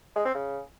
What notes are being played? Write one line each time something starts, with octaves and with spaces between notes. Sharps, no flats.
G#3
C4
C#3